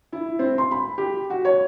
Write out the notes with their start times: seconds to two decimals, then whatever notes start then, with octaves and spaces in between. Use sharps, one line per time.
0.13 E4
0.39 C4
0.58 C6
0.71 B5
0.98 G4
1.30 F#4
1.45 C#5